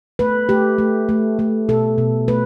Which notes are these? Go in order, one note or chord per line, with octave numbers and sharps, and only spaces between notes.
A3 B4
A3 G4
A3
A3
A3
B2 A4
B2
A3 B4